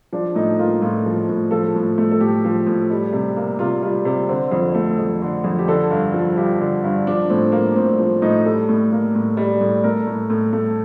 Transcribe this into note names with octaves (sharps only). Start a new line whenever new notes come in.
F3 D4
A2 D#4
A#3 F4
A2 F4
F3
A2
F3 A4
A2
A3
A4
A2 G4
F3
A2
G3
C3
A#3
C3 F4
G3 F4
C3
D3 C4
F2
A3
F2
D3
F2
G4
D3 A4
G2
F3
G2 G4
D3
G2
F3 D4
A2 C4
A#3
A2 C4
F3 C4
A2 D#4
G3 A4
A2
A#3
A2
G3
A2
A3 A#4
A2
A2
A3